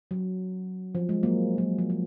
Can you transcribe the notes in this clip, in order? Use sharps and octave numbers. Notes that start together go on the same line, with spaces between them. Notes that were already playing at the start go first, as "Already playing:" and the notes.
F#3
F3
G#3
F#3 A#3
F#3 A#3
F3
F3